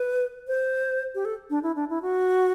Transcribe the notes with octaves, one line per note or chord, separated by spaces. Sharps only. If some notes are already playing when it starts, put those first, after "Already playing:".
Already playing: B4
C5
G4
A4
D4
E4
D4
E4
F#4